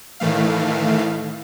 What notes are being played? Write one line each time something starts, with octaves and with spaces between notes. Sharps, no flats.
A2 D#3 E3 A3 F5